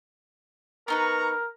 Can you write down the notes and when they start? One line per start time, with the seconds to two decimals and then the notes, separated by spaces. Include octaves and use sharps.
0.88 B3 D#4 A#4 B4 A#5 C#6